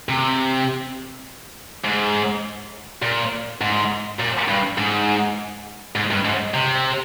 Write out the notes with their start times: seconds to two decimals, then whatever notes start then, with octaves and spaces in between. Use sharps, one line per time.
0.09 C3
1.84 G#2
3.02 A#2
3.61 G#2
4.20 A#2
4.48 G2
4.78 G#2
5.96 G#2
6.11 G2
6.25 G#2
6.54 C3